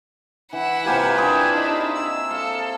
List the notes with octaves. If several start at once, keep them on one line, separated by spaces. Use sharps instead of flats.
E3 E4 F#5
C3 A#3 F4 G4 B4 G#5
D4 E4 G#4 A#4
D#4
E6
A4 F5